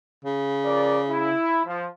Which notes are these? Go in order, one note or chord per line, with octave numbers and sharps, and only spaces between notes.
C#3
F3 A#4 D5
E4
F3